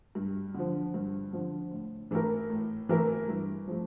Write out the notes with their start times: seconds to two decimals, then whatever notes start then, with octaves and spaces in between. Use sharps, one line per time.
0.15 G2
0.54 D3 F3
0.94 G2
1.33 D3 F3
1.72 A2
2.11 E3 A3 E4 A#4
2.50 A2
2.89 E3 A3 E4 A#4
3.28 G2
3.68 F3 A3